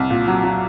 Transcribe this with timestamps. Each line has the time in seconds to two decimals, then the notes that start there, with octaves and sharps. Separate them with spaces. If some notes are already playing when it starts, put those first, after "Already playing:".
Already playing: C2
0.10 A#2
0.27 F#3
0.43 F#3